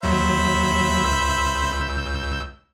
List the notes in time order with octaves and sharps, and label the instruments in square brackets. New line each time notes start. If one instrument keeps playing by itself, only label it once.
[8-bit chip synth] D#2 F#3 [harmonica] C5 E5 B5
[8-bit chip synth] C#2 E6 G6